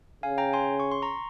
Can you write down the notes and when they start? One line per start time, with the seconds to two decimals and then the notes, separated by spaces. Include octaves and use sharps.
0.23 C#3 F5 G#5
0.38 G5 A#5
0.53 G#5 C6
0.80 C#6
0.92 C6
1.02 A#5 C#6